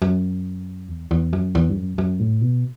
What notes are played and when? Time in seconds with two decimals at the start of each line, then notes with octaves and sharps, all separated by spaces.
0.02 F#2
0.89 E2
1.11 E2
1.33 F#2
1.55 E2
1.69 G2
1.76 F#2
1.98 F#2
2.20 A2
2.41 B2